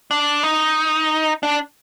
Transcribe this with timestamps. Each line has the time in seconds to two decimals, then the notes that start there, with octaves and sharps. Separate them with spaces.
0.11 D4
0.43 D#4
1.43 D4